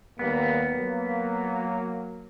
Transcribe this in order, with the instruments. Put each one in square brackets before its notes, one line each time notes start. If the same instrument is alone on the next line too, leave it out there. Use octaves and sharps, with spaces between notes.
[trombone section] D#2 G3 A#3 [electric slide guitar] B3
[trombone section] F#3 A#3